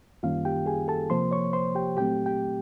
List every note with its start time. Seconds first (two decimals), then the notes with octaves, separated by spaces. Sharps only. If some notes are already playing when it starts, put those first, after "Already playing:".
0.23 F#2 D#3 G3 A#3 C#4 F4 F5
0.45 G4 G5
0.66 G#4 G#5
0.88 A4 A5
1.10 C3 F3 A#3 C5 C6
1.31 C#5 C#6
1.53 C5 C6
1.75 G4 G5
1.97 A#2 F#3 A3 C4 G4 G5
2.26 G4 G5